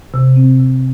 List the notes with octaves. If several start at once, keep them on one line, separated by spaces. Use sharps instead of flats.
C3
C4
C3